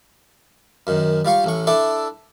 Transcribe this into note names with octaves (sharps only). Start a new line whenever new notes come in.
F#2 D#3
G3 F4 F5 C#6
A1 A2 C#6
D4 E4 A4 D5 E5